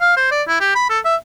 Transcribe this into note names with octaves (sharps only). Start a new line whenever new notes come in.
F5
C5
D5
E4
G4
B5
A4
E5